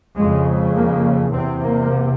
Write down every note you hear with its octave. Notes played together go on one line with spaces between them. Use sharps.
F2 C#3 G#3
A#3
E2 C3 C4
A#3